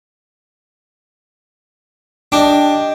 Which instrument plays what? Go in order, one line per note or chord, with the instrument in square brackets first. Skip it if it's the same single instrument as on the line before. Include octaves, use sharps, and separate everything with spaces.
[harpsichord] D4 [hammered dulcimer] G4 D#5